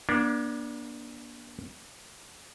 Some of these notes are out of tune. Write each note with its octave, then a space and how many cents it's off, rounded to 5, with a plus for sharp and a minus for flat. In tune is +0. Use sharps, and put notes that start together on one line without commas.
A#3 +40 D4 +0